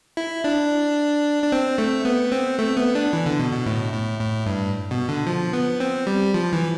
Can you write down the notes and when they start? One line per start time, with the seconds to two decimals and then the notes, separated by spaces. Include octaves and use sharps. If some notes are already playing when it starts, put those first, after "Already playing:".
0.17 E4
0.44 D4
1.43 D4
1.52 C4
1.78 A3
2.05 B3
2.32 C4
2.59 A3
2.77 B3
2.95 D4
3.13 E3
3.26 D3
3.39 B2
3.52 B2
3.66 A2
3.93 A2
4.20 A2
4.46 G2
4.91 B2
5.08 D3
5.27 F3
5.53 B3
5.80 C4
6.07 G3
6.34 F3
6.53 E3